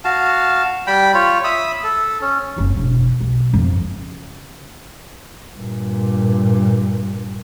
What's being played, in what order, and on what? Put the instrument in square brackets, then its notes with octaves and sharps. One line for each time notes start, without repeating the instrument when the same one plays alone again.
[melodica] F#4 F5 A5
G3 G5 B5
F4 C#5
E5 B5 D#6
A4
C#4
[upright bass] F#1 F2
E1
B1
G1 F2
C#3
[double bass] G2 A#2